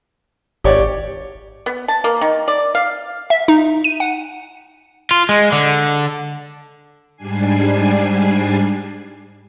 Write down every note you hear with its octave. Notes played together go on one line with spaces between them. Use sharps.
G#1 G4 C#5 D5
B3
A5
A#3
D#3
D5
F5
E5
D#4
D#7
F#5
F4
G#3
D3
G#2 G3 D4 G#5 C7